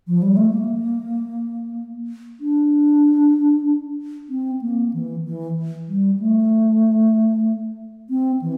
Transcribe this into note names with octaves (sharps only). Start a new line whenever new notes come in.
F3
G3
A3
A#3
D4
C4
A#3
E3
E3
G3
A3
C4
E3